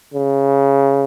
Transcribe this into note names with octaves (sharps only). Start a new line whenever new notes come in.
C#3